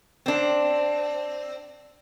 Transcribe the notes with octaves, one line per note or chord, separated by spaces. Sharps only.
C4 D4